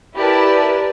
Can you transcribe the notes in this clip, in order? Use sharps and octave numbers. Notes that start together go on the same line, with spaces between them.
E4 G4 A#4 B4 D5 A5